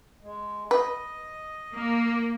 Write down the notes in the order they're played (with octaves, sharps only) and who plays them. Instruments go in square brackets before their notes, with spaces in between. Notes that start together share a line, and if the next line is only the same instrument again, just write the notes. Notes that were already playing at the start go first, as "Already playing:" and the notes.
[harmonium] G#3
[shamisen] B4 [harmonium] D#5
[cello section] A#3